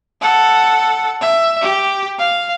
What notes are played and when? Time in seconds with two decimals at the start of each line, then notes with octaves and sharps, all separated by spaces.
0.22 A4 F#5
1.21 E5
1.62 G4
2.19 F5